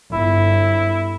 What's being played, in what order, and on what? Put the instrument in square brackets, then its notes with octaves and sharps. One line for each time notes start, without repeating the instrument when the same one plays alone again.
[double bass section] G1 [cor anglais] E4